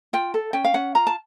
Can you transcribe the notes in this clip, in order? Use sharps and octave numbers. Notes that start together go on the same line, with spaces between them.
F4 G5
A4
C#4 G5
F5
C#4 F#5
F4 A#5
A5